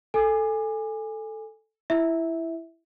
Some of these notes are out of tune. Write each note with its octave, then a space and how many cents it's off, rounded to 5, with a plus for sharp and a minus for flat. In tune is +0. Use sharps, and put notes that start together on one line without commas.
A4 +0 G#5 -15 D6 +30
E4 +10 E5 -15